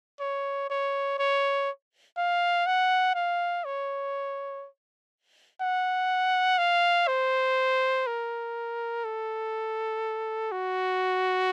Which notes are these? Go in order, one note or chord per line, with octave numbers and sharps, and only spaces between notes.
C#5
C#5
C#5
F5
F#5
F5
C#5
F#5
F5
C5
A#4
A4
F#4